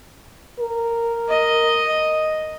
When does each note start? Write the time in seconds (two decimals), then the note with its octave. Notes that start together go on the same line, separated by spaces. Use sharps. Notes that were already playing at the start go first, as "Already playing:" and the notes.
0.60 A#4
1.29 D#5